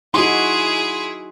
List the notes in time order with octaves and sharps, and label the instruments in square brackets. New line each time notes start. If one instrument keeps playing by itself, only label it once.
[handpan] D#4 F#4 [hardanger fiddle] E4 G#4 [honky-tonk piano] C6